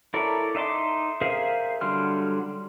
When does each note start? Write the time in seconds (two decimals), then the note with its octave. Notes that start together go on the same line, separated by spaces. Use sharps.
0.14 E4 A4 A#4 C#5 D5
0.55 D#4 E5 F5 C6 D6
1.21 G#4 A#4 C5 E5 F5
1.81 D3 F#3 G3 C6 F6